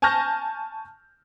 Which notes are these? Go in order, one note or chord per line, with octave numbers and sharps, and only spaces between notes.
G#5 A5 C#6 F6 G6 A#6